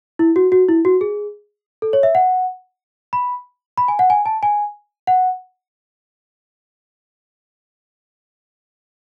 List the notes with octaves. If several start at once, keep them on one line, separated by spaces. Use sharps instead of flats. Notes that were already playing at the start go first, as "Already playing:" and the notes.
E4
F#4
F#4
E4
F#4
G#4
A4
C#5
E5
F#5
B5
B5
G#5
F#5
G#5
A5
G#5
F#5